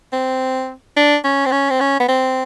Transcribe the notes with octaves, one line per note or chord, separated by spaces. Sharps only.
C4
D4
C#4
C4
C#4
C4
C#4
B3
C4